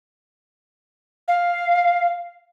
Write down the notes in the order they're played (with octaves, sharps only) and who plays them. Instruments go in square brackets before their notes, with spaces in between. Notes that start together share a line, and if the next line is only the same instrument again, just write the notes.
[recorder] F5